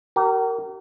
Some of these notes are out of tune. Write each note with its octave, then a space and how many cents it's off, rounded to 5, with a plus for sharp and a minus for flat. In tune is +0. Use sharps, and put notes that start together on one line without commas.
G4 -45 A#4 -20